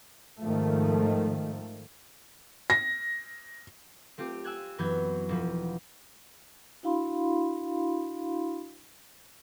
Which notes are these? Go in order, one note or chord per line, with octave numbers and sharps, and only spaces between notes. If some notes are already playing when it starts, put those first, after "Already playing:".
G#2 D#3 F3 A3
A#6
A3 C4 F4 G4
G#5 E6 F#6 G#6
F#2 E3 B3 B5 G6 G#6
E1 F3
D4 E4 F#4 F5 B5 C6